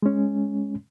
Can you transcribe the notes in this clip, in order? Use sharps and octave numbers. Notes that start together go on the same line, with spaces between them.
G#3 C#4